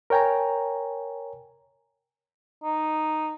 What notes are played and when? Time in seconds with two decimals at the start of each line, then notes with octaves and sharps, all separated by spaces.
0.10 A#4 C#5 G5 G#5 A#5
2.64 D#4